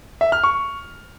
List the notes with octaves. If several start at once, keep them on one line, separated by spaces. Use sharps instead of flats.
E5
F6
C#6